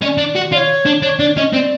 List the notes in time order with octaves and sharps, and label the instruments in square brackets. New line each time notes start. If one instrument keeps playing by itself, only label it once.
[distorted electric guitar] C#4 [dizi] D#5
[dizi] D5
[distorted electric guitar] D4
F#4
[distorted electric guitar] F4 [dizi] D5
[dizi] C#5
[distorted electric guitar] D4
[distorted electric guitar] D4 [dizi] C#5
[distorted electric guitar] D4 [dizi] D5
[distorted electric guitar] C#4 [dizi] D#5
[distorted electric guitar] C4 [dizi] D5